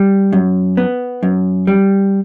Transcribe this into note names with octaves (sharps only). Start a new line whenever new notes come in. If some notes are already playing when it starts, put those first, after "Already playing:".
Already playing: G3
F#2
B3
F#2
G3